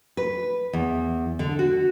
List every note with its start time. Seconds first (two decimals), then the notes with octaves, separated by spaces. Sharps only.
0.17 B4
0.73 E2
1.39 D3
1.59 F#4